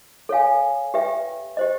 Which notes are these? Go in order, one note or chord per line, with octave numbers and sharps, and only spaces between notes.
A4 C#5 F5 G#5
G4 B4 E5 G5
G4 C5 D#5